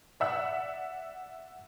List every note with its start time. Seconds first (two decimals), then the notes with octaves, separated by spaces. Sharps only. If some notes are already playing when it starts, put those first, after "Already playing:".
0.20 D5 E5 F#5 E6